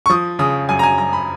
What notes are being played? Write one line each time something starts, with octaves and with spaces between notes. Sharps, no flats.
C#6
F3 D#6
C#3 D#6
F#2 G#5
A#5
G#5
F#2 A#5
B5